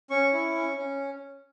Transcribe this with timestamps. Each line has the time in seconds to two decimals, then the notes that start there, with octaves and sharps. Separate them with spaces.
0.10 C#4 C#6
0.33 E4
0.55 C#4
0.78 C#4